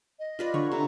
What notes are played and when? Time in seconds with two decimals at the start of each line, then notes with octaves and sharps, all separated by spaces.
0.19 D#5
0.39 F4 B4 D5
0.54 D3 C#5 C#6
0.72 C3 A#5